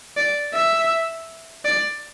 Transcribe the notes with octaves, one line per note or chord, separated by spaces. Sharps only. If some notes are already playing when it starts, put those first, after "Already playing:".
D5
E5
D5